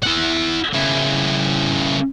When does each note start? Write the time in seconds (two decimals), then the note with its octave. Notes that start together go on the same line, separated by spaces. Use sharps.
0.03 E4 F#5
0.74 C#3 E4